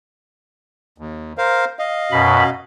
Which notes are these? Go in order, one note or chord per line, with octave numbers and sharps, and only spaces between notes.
D#2
A#4 C5 F5
D#5 F5
F#2 B2 B5